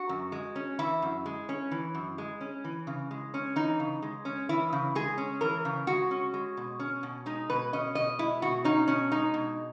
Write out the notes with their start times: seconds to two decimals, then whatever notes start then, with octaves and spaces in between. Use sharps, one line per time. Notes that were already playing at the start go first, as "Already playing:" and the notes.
Already playing: F#4
0.09 F#2
0.32 G#3
0.56 C#4
0.79 E3 E4
1.02 F#2
1.26 G#3
1.49 C#4
1.71 E3
1.94 F#2
2.18 G#3
2.41 C#4
2.64 E3
2.87 C#3
3.11 G#3
3.34 C#4
3.56 E3 D#4
3.80 C#3
4.02 G#3
4.25 C#4
4.49 E3 E4
4.72 C#3
4.95 G#3 G#4
5.18 C#4
5.41 E3 A#4
5.65 C#3
5.87 G#3 F#4
6.11 C#4
6.34 G#3
6.57 B2
6.80 C#4
7.03 B2
7.26 G#3 D#4
7.50 B2 B4
7.73 C#4 D#5
7.95 B2 D#5
8.19 G#3 E4
8.42 B2 F#4
8.64 C#4 D#4
8.88 B2 C#4
9.11 G#3 D#4
9.34 B2